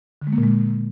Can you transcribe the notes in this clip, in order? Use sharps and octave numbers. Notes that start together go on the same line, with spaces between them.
D3
G#3
A#3
A#2
G#3